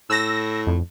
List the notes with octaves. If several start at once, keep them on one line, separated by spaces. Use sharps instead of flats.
A2 E6 A#6
F2